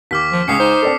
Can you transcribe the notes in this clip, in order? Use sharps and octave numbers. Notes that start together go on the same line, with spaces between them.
D#2 D6 F6 B6
F3
C#2 G#3 C#4 D#6 C7 C#7
D#4 C5
C4 D4 A4